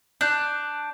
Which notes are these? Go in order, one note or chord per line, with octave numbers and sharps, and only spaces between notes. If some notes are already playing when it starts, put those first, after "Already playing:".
D4 F#6 G6